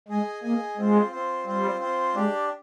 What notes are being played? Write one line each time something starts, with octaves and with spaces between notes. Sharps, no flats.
G#3 G#4 D#5 G#5
A#3 G#4 D#5 G#5
G#3 C4 F4 C5
C4 F4 C5
G3 C4 F4 C5
C4 F4 C5
G#3 D4 G4 D5